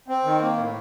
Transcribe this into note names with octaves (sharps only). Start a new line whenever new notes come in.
C4
D#3
A#3
A2